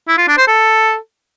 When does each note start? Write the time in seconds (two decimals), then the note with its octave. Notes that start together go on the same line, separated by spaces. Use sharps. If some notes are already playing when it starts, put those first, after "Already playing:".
0.08 E4
0.18 F4
0.28 D4
0.38 C5
0.48 A4